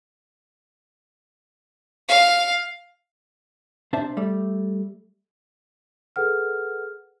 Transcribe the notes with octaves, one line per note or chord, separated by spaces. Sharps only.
F5
C3 D4 C5 E5 A5
G3 A3
G#4 A4 B4 F#5 F6